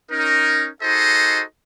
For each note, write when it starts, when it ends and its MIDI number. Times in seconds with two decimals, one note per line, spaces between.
0.12 0.69 61
0.12 0.69 63
0.12 0.69 70
0.83 1.43 63
0.83 1.43 66
0.83 1.43 68
0.83 1.43 69
0.83 1.43 72
0.83 1.43 75